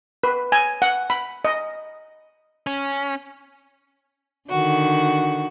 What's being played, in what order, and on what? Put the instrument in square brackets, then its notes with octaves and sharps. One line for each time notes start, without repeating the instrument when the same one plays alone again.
[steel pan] B4
G#5
F#5
B5
D#5
[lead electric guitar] C#4
[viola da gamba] D3 D#3 [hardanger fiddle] F#4